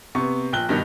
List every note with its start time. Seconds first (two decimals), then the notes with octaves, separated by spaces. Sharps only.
0.15 C3 B3 C#6
0.53 A#1 G5 F#6 G7
0.69 G2 B2 D#3